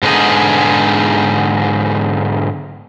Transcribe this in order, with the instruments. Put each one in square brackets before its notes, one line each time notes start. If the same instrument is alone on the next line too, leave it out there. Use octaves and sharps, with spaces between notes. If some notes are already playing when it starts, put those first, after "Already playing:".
[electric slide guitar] G#2 D3 B3 D#4 G#4